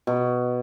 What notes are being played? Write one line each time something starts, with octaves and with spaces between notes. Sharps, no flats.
B2